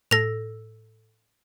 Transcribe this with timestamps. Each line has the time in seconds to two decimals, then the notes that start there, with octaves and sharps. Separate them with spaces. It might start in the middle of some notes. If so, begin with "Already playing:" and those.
0.11 A2 A4 E6 A#6 F7